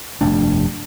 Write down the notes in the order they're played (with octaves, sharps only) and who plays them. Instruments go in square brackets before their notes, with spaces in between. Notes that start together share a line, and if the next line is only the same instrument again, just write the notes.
[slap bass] F1 G2 A3 D4